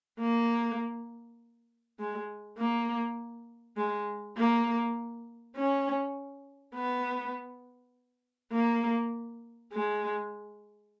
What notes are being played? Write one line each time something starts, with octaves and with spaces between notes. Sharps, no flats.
A#3
G#3
A#3
G#3
A#3
C#4
B3
A#3
G#3